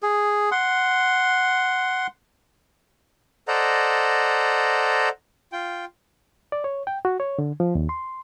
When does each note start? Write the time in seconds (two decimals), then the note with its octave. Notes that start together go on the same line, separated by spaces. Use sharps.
0.02 G#4
0.51 F#5 C6
3.48 A4 C5 D5 D#5 F#5 A#5
5.53 F4 G5
6.52 D5
6.64 C#5
6.87 G5
7.05 F#4
7.20 C#5
7.39 D3
7.60 F3
7.75 D#2
7.89 C6